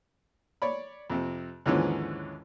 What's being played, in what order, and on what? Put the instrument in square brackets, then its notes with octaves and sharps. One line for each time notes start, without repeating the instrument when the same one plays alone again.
[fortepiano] C#5 D5 B5
F2 C3
D#2 G#2 D3 E3 F3 C#4